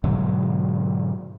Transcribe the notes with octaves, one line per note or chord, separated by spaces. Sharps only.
G#2 B2 D3 F#3